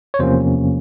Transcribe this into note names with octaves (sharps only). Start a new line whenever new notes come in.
C#5
E2 C3 F3 A#3 C#4 C5